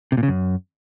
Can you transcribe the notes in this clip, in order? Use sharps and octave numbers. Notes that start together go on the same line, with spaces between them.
C3
A#2
C#3
F#2